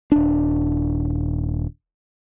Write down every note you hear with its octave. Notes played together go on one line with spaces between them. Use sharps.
D#1 D4